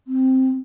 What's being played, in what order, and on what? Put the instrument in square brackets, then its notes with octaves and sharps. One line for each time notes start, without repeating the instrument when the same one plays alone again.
[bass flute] C4